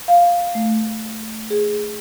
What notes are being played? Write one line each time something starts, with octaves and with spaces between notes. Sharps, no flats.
F5
A3
G#4